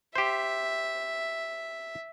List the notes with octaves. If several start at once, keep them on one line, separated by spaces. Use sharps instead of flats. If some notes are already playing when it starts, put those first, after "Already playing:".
G4 C5 E5